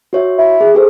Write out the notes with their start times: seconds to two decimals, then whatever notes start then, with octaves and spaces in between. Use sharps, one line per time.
0.13 F#4 C#5 E5
0.38 E4
0.61 G#4
0.75 G4 A4 C5